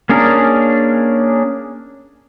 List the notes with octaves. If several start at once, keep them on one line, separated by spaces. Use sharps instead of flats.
A#3 C#4 D4 G#4 A#4